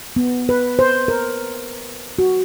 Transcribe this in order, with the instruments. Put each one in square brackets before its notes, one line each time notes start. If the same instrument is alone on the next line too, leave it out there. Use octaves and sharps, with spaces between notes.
[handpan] B3
B4
C5
A#4
F#4